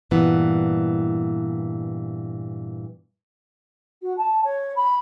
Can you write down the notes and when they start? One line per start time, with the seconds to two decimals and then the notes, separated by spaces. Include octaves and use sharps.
0.11 G2 A#2 E3 B3
4.02 F#4
4.17 A5
4.44 C#5
4.76 B5